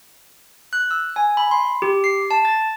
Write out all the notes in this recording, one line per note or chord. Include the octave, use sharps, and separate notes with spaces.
F#6
E6
G#5
B5
C6
G4
C7
A5
A6